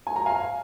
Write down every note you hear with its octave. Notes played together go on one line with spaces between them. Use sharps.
G#5
A#5
F5 G#5